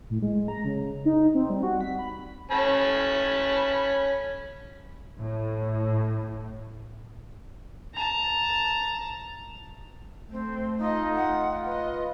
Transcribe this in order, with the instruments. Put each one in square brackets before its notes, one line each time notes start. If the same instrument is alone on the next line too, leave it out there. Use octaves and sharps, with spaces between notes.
[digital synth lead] A2
G#3
A#5
C#3
D#4
C4
G3
F#4
B6
B5
[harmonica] C#4 A5 B5
[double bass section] A2
[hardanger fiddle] A5 A#5
[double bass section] A3 [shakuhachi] C4
[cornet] D#4 [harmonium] F4 [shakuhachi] D#5
[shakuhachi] F#5
[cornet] B4 [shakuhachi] D#5